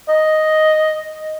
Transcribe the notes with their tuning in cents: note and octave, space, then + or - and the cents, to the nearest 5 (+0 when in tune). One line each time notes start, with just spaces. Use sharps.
D#5 +0